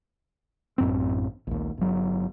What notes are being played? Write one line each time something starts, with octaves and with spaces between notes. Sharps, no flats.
A1 F#2 C4
A#1 D#2
G1 F#3